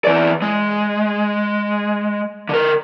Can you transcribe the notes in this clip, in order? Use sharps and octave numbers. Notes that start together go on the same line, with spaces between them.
E3 D5
G#3
D3 A#4